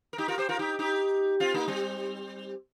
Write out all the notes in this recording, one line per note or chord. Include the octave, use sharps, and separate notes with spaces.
A#4
D#4 G4
F4 A#4
G4 C5
F4 A#4
D#4 G4
D#4 G4
C4 F4
A#3 D#4
G3 C4